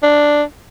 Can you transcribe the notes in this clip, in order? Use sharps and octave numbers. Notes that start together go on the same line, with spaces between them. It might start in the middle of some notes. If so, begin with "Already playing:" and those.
D4